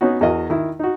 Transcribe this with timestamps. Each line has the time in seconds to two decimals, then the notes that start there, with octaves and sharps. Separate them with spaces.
0.01 B3 C#4 D#4 F#4
0.21 E2 F#4 A#4 D#5
0.50 D#3 E4
0.79 D#4 F#4